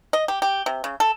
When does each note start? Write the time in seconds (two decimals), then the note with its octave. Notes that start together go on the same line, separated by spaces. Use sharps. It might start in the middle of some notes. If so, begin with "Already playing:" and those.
0.13 D#5
0.28 G4
0.42 G4
0.66 C3
0.84 C#3
1.00 A4